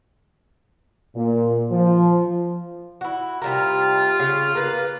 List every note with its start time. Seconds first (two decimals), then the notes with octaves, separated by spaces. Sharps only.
1.16 A#2
1.71 F3
3.01 E4 F#4
3.42 C3 G3 F4 A#4
4.19 C#3
4.55 A#3 B4 F5